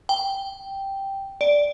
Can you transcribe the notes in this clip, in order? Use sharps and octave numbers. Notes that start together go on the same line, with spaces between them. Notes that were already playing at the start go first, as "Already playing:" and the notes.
G5
D5